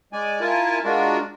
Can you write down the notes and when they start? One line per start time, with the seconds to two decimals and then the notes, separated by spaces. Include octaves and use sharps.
0.13 G#3 D5 G#5
0.41 E4 F4 A#4 G#5 A5
0.84 G#3 D4 F4 F#4 A#4